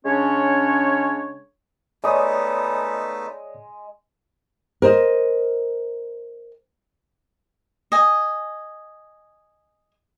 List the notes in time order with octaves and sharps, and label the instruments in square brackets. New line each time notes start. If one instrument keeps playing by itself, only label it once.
[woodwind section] C#3 G#3 C#4 D4 C#5
[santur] G#3 D#6 [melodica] A3 B3 D#4 [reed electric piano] C#5 D5
[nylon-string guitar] A#4 C5 D#5
[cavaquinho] D#5 G#5